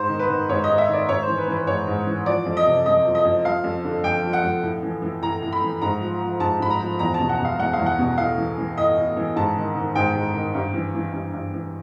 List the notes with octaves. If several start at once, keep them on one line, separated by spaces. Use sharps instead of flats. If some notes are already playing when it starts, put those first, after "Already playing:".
Already playing: G#2 C5
D#3
B4
D#3
G#2 C#5
G#2 D#5
E5
D#3 D5
G#2 C#5
C5
E3
B4
E3 B4
G#2 C#5
G#2
E3
F3 D5
F2
D#5
C3
F2 D#5
F3
D#5
F2
F3 F5
F2
D3
F2 G5
F3
F#5
F2
A2
E3
E3
A2 A#5
A2
B5
E3
G#2 A#5
F3
F3
G#2 A5
G#2 B5
A#5
F3
E2 A#5
A5
B2
F#5
B2
F5
E2 F#5
F5
E2
F#5
B2
A2 F5
E3
E3
A2 D#5
A2
E3
G#2 A5
D#3
D#3
G#2 G5
G#2
D#3
G2
E3
E3
G2
G2
E3